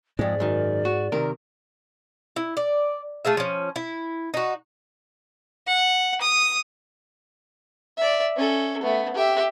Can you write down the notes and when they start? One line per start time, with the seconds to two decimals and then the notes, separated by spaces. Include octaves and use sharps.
0.19 F2 G#2 G#3 D5
0.40 F#2 D#3
0.85 F#4
1.12 C3 D#3 A#4
2.36 E4
2.57 D5
3.25 A3 F4 G#4 E5
3.37 F3 C#4
3.76 E4
4.34 D#4 F#4
5.67 F#5
6.21 D#6
7.97 D5 E5
8.36 C#4 A4
8.83 A3 B3
9.14 G4 E5